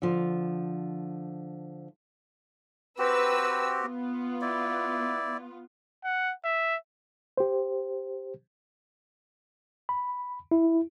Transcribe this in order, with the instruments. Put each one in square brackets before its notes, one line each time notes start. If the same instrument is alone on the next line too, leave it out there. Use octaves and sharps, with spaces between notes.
[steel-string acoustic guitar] D3 F3
[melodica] C4 F#4 G4 [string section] B4 E6
[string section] B3 F4
[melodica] E4 D5
[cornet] F#5
E5
[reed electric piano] G4 C5
[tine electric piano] B5
E4